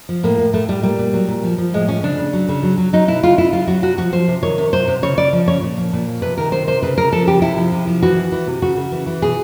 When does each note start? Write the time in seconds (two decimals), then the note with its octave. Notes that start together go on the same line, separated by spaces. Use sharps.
0.09 F3
0.23 A2 A#3
0.39 A2
0.53 A2 A3
0.69 A2 G3
0.83 A#2 G3
0.98 A#2
1.13 F#3
1.28 A#2
1.43 F3
1.58 F3
1.73 A2 G#3
1.88 F3 C#4
2.03 C#3 D4
2.18 C#3
2.33 F#3
2.48 C#3
2.63 F#3
2.78 F#3
2.93 F#3 D#4
3.08 B2 E4
3.23 C#3 F4
3.38 C#3 E4
3.53 F#3 F4
3.67 F#3 F#4
3.83 C3 F#4
3.98 F3 F#4
4.12 F3 C5
4.28 C3
4.43 D#3 C#5
4.58 C3
4.73 F#3 C5
4.88 C3
5.02 C#3 C#5
5.17 C#3 D5
5.33 F3
5.48 C#3 C#5
5.62 A#2
5.77 F3
5.93 A#2
6.07 F3
6.22 C3 B4
6.38 D#3 A#4
6.52 C3 C5
6.67 C3 C5
6.82 C#3 B4
6.97 C#3 A#4
7.12 F3 A4
7.27 C#3 G4
7.42 C3 E4
7.57 F3
7.72 C3
7.87 F3
8.02 E3 F#4
8.17 E3
8.32 E3
8.47 C3
8.62 C#3 F#4
8.77 C#3
8.92 E3
9.07 E3
9.22 B2 G#4